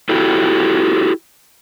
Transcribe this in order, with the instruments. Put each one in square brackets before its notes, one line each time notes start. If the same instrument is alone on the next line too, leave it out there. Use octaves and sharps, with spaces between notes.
[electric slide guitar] E4 F#4 G4 A4